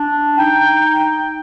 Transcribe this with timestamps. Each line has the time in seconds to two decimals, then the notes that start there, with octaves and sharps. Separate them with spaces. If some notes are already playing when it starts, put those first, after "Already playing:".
Already playing: D4
0.37 D#4 G5